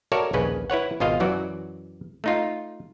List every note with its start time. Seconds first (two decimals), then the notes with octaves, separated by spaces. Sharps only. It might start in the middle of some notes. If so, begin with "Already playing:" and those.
0.12 F#4 A4 A#4 C#5 D5 E5
0.33 A#1 D#2 C#3 C#4 B4
0.70 E4 B4 C#5 F#5
1.00 G#1 B2 F4 D#5 F5
1.20 F#2 E3 F#3 F#4 D5
2.24 A3 D#4 F4